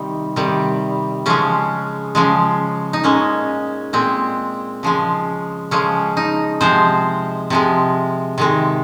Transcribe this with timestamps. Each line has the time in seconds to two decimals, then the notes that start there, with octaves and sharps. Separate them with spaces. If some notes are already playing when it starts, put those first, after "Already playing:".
Already playing: C3 D#3 G3 D#4
0.36 C3 D#3 G3
1.26 C#3 F3 G#3 C#4
2.15 C#3 F3 G#3
2.93 D#4
3.04 A#2 G#3 C#4
3.93 A#2 G#3 C4
4.83 C#3 F3 G#3
5.71 C#3 F3 G#3 C#4
6.17 D#4
6.61 C3 F3 G#3 C5
7.50 C3 F3 G#3
8.38 C3 D#3 G#3